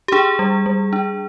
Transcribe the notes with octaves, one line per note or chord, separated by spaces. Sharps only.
G4
D4 G#4
G3
G3
D4